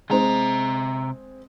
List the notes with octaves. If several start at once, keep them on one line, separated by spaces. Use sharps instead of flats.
C3 G#3 C4 A#5